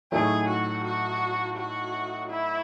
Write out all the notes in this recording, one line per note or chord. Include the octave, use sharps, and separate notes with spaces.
A2 F#3 A3 D#4 G#4 A4
F#4
F#4
F#4
E4